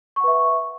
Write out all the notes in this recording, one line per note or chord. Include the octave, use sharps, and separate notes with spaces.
B4 E5 F#5 C#6